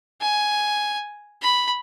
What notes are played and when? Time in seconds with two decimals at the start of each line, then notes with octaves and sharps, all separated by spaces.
0.21 G#5
1.42 B5